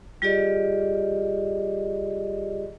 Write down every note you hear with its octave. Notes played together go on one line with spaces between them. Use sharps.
G3 F4 G4 G#4 D5 D#5